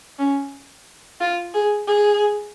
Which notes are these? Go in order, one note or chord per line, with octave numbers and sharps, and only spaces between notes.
C#4
F4
G#4
G#4